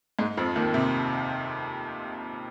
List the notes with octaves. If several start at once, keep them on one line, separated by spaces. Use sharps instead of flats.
G#2 G#3
F2 F3
D#2 D#3
C3